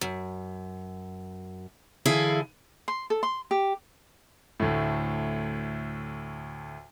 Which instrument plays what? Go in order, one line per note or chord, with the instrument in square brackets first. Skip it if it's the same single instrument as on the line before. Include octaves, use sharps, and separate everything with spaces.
[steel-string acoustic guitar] F#2
D3 E3 E4 G#4 F5
[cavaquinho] C6
A4
C6
G4
[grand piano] D2 A2